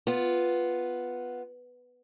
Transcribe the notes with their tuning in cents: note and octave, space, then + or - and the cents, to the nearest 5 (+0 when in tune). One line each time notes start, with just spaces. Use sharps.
B3 +0 F4 +5